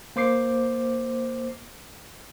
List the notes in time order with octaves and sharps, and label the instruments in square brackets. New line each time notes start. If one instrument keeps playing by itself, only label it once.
[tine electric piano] A#3 C5 D6 C7